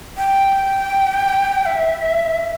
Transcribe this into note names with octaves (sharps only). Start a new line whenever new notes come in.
G5
E5